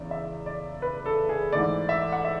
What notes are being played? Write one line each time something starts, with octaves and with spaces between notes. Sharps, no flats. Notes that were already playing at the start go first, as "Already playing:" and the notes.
Already playing: E2 C#3 D5 E5
E5
D5
B4
A4
G#4
G#2 E3 A3 D5
E5
F#5
E5